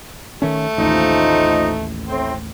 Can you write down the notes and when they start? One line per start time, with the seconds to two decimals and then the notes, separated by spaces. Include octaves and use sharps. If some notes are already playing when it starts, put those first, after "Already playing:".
0.42 D#3 A3 C#4
0.78 A1 D#2 F3 D#4
2.09 A2 C4